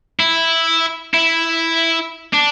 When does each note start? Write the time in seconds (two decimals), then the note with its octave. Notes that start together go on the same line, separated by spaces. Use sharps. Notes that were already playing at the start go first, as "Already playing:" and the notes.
0.20 E4
1.14 E4
2.34 D4